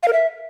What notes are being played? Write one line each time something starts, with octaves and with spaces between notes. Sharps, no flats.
F5
A#4
E5